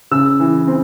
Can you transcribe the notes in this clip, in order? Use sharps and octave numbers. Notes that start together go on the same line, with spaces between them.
C#3 E6
E3
C4